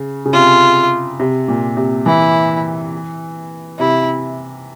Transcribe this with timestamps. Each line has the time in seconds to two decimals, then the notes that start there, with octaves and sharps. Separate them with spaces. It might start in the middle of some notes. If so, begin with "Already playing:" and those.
Already playing: C#3
0.26 C#3
0.33 C3 F4
1.20 C3
1.48 A#2
1.77 C3
2.06 E3 E4
3.79 C3 E4